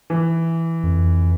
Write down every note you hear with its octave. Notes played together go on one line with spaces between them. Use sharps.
E3
F2